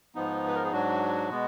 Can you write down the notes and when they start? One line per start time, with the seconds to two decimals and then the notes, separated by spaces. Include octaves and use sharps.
0.15 G#2 F3 B3 D#4
0.48 B4
0.55 A#4
0.64 G#4
0.72 G#2 F#3 D4 F#4
1.30 B2 G#3 B3